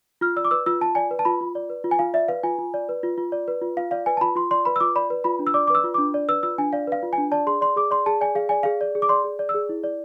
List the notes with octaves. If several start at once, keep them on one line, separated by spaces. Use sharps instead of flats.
F4 F6
D5 E6
D6
B4 E6
F4 E6
F4 A5
D5 G#5
B4
A5
F4 B5
F4
D5
B4
F4
G#5
F4 F5
D5 E5
B4 F5
F4 G#5
F4
D5
B4
F4
F4
D5
B4
F4
F4 F5
D5 F5
B4 G#5
A5
F4 B5
F4 C6
D5 C6
B4 B5
E6
F4 D6
D5 B5
B4
F4 B5
D4
E6
D5 D6
D6
B4 E6
F4
D6
D4
D5
B4 E6
F4 E6
D4 G#5
D5 F5
B4 F5
F4
G#5
D4
D5 A5
G#4 C6
D5 C6
G#4 D6
D5 C6
G#4 A5
D5 G#5
G#4 F5
D5 G#5
G#4 F5
D5
G#4
D6
D5 C6
G#4
D5
E6
G#4
E4
D5